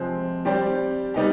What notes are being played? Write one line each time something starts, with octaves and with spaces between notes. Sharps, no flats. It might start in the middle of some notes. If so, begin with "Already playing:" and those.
Already playing: C3 F3 G#3 C4
G3 C4 G4 D5
G3 B3 D#4 G4